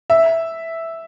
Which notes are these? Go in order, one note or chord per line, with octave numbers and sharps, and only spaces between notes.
E5